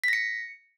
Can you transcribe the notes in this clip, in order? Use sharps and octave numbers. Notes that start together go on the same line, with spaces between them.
A#6 B6 C#7